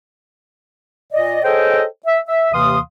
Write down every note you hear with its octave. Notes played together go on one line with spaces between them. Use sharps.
A#2 D5 D#5
G#4 A4 C5 C#5 D#5 G5
E5
E5
D#2 C3 E3 F5 C6 D#6